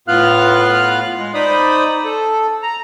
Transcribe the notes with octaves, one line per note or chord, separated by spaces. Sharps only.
A2 B3 F4 F5 F6 F#6
G#3
D#4 C5 D5 B5 D#6
A4
A#5